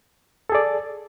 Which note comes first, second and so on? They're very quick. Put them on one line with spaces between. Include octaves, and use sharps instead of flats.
A4 G#4 D5